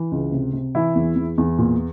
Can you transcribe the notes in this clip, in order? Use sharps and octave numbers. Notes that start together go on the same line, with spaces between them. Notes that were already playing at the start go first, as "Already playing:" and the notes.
Already playing: E3
C#2
C3
C3
E3 E4
E2
E2
E2
A#2